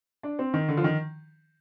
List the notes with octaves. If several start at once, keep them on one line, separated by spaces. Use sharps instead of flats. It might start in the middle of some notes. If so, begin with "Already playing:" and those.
D4
C4
D#3
D3
F3
D#3